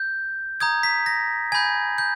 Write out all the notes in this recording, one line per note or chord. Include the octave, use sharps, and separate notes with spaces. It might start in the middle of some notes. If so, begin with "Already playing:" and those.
Already playing: G6
A#5 D#6 G6 G#6
B6
A#6
G#5 B5 G6 G#6
G6